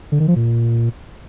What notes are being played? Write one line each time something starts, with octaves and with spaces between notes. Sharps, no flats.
D3
D#3
F3
A#2